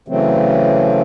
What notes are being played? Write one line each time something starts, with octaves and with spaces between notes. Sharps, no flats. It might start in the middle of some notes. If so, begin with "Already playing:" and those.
C#3 E3 F#3 A3 C4